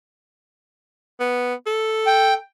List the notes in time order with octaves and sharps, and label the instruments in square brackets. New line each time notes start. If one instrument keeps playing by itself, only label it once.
[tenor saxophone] B3
A4
[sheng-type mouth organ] G5